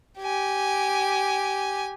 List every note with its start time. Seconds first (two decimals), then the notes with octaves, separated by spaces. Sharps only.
0.19 G4 G#5